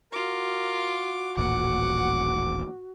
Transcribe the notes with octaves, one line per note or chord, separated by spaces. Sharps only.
F4 F#4 A#4 D6
D#1 A1 A#2 F#5 D6